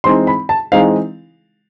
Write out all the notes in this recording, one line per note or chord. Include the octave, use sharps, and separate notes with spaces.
E3 G#3 C4 D#4 C6
B5
A5
E3 G#3 C4 D#4 F5